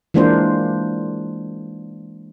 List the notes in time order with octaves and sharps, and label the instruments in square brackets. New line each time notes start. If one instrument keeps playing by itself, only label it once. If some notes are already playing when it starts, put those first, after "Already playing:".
[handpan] E3 G#3 A#3 D4 F4 C5